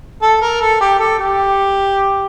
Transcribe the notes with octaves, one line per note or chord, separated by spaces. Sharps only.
A4
A#4
A4
G4
A4
G4